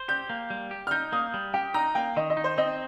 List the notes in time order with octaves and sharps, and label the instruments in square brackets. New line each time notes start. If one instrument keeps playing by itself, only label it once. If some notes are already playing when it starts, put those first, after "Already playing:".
Already playing: [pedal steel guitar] C5
[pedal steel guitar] G4 [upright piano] G6
[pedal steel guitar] A#3
G3
G4
[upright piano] F6
[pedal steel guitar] D#4 [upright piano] G6
[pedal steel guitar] A#3 [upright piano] D#6
[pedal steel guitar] G3
[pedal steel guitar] G4 [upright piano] G5
[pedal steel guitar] D#4 [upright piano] A#5
[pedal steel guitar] A#3 [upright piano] G5
[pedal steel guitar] D#3 [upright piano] D#5
[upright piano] D#5
[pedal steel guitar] D#4
[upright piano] C5
[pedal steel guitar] C4 [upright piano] D#5